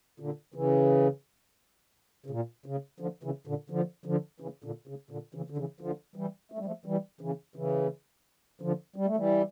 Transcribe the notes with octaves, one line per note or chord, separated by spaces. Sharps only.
A#2 D3
C#3 E3
C#3
A#2
C#3
D3 F3
C#3 E3
A#2 D3
D3 F3
D3 F3
C#3 E3
A#2 D3
C#3
A#2 D3
C#3 E3
D3
C#3 E3
D3 F3
E3 G3
A3
G3
F3 A3
E3 G3
C#3 E3
C#3 E3
D3 F3
G3
A3
E3 G3